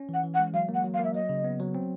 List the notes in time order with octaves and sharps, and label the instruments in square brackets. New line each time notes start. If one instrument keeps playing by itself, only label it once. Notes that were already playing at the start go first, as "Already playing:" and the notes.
Already playing: [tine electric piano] C#4
[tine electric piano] E3 [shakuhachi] F#5
[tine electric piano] E3
[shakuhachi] F#5
[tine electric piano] G#3
[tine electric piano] F#3 [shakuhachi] F5
[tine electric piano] A#3
[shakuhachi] F#5
[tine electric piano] F#3
[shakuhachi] F5
[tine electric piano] A#3 [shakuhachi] E5
[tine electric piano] F#3 [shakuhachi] D#5
[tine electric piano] C#3
B3
F#3
C4